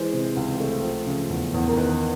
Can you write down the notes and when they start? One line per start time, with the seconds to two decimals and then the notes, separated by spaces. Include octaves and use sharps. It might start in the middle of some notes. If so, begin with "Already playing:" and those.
Already playing: E3 G#3 C5
0.13 C3
0.37 C#2
0.60 A3
0.84 F3
1.06 C#3
1.30 E2
1.54 E2
1.68 A#4
1.77 D#3 B4